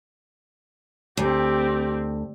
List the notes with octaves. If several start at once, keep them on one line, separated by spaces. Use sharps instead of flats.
D2 C4 G4